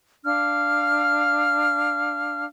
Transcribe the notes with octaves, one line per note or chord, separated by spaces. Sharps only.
D4 F5 F6